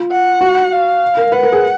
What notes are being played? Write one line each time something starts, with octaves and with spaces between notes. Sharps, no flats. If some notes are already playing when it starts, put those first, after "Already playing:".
Already playing: F4
F#5
F#4
F5
A#4
B4 F#5
A#4
G#4